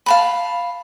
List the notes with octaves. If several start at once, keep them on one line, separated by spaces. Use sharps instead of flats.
F5 A5 B5